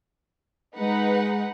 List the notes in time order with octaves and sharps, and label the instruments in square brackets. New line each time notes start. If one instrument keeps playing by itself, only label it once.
[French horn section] G#3 [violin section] D#4 B4 F#5